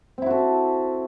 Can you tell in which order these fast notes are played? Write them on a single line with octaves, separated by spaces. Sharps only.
C4 E4 F#4 A4